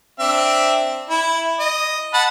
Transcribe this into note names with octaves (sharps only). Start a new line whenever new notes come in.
C4 D4 E5
E4
D#5
F#5 A5 B5